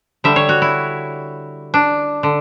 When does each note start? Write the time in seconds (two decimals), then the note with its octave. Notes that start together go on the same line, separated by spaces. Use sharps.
0.24 D3 G3 E5
0.36 C#5
0.49 F#4
0.62 E4
1.74 D4
2.23 D3